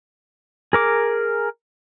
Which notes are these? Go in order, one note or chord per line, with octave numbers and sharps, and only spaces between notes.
G#4 A#4 D6